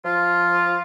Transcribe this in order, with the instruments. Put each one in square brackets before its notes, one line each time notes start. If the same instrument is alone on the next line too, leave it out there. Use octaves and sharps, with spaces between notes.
[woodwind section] F3 F4